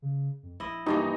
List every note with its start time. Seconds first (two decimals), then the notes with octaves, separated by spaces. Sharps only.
0.02 C#3
0.43 F2
0.60 A#1 E4 D#5
0.86 G2 E3 A#3 D#4